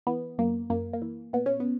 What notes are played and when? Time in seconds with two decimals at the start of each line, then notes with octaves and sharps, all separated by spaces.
0.07 E3 B3
0.38 F#2 A#3
0.70 F#2 A#3
0.93 A#3
1.02 E3
1.33 A#2 B3
1.46 C#4
1.60 B3